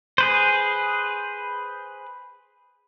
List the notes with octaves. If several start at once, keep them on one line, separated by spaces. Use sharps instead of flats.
G#4 B4 C5